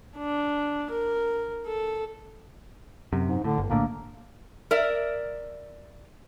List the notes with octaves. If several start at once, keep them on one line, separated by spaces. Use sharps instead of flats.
D4
A#4
A4
F#2 C3
G#2
A2 D3
G1
A#1 A2 D3 A#3
A#4 D5 E5